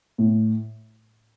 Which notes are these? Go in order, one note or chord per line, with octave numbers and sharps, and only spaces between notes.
A2